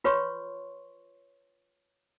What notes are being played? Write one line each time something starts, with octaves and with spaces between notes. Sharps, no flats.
F4 B4 C#5 C6 C#6